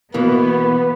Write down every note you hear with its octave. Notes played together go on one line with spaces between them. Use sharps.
B2 E3 A#3 B3 B4